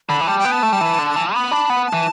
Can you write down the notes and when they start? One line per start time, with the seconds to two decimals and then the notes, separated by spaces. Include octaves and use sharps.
0.09 D3 B5
0.21 E3
0.27 G3 A5
0.39 G5
0.45 B3
0.52 A5
0.63 A3
0.73 G3
0.81 E3
0.99 D3
1.16 E3
1.34 B3 B5
1.51 D4
1.70 B3
1.87 A5
1.93 E3